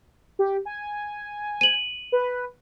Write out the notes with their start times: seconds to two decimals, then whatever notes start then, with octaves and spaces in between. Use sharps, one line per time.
0.39 G4
0.65 G#5
1.61 D#7 F#7
2.12 B4